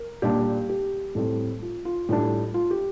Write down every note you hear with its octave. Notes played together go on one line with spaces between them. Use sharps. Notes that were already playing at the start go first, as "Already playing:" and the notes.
Already playing: A#4
A#2 G3 D4 G4
G4
A2 G3 C4 A4
F4
F4
A2 G3 D4
F4
G4